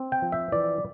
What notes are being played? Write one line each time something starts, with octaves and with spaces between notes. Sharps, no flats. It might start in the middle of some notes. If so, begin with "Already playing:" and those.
Already playing: C4
G5
F3
E5
E3 D5